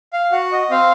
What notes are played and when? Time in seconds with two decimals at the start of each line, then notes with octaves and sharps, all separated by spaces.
0.13 F5
0.32 F#4 F#5
0.52 D#5
0.70 C4 F5